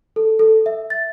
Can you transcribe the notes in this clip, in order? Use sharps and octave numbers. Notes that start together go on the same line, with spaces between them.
A4
A4
E5
A6